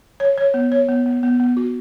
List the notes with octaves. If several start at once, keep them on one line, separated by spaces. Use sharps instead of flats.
C#5
C#5
B3
C#5
B3
B3
B3
B3
F#4